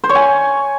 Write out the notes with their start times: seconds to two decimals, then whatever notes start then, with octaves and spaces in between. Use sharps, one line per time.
0.04 C5
0.09 C#5
0.15 G#5